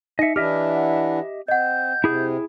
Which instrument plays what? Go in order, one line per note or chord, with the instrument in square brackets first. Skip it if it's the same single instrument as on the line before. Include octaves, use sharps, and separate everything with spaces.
[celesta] D#4 C#7 [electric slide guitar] D#5 E5
[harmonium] E3 D4 E4 [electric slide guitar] G4 D#5 E5 [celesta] F6
[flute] F#5
[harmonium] C4 [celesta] D#5 F#5 [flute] G6
[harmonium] C3 [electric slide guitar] E4 G#4